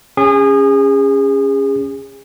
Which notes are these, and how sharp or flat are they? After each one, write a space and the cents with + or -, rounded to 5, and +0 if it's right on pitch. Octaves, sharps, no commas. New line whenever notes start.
C#4 +0 G#4 -30